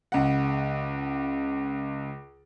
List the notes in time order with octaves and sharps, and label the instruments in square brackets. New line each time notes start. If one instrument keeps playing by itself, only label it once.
[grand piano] C#2 F#5